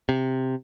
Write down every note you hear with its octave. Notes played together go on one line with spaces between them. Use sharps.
C3